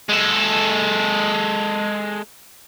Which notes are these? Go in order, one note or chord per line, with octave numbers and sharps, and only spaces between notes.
G#3 A4